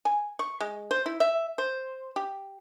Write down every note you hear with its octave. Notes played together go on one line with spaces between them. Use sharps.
G#5
C#6
G#3
C5
E4
E5
C5
G4